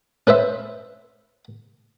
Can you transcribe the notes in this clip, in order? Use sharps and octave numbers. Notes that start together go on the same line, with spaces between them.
C#4 B4 C5 E5